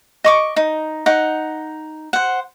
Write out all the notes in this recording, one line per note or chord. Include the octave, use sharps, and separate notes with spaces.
D#5 C#6 D6
D#4
D#4 F#5
C5 F#5